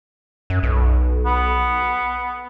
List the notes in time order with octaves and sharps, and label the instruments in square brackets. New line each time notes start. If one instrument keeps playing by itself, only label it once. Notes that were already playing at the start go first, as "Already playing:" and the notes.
[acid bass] F#2
B1
[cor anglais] B3